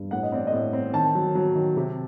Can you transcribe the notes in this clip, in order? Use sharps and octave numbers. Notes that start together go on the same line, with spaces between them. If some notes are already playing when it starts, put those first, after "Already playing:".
Already playing: G2
A2 F#5
D#5
C4 D5
D#5
A2
C4
D#3 A5
F#3
F#3
D#3
C3